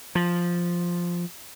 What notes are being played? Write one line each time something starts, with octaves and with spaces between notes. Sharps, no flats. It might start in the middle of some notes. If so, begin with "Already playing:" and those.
F3